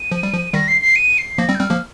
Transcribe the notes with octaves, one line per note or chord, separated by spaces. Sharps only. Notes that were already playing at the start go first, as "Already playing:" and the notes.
Already playing: D#7
F3
G3
F3
D#3 G3 A#6
C7
C7
D#7
C7
F3 A#3 A#6
G3 C4
G6
G3 C4 F6
F3 A#3